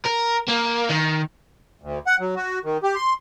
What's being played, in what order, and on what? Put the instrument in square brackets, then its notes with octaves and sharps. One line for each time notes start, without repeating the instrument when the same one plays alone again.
[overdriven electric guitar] A#4
A#3
D#3
[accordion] D2
F#5
F#3
F#4
D#3
G4
C6